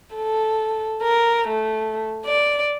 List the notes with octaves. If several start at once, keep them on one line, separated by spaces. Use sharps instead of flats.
A4
A#4
A3
D5